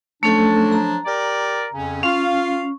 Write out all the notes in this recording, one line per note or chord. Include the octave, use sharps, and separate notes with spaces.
F3 F#3 A3 C#4 D4 A4
A#5
G4 A#4 D5
F2 C#3 C#4
C#4 F4 F5